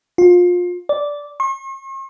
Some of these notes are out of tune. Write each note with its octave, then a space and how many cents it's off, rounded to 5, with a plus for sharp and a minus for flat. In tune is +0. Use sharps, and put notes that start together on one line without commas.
F4 +25
D5 -10
C#6 -45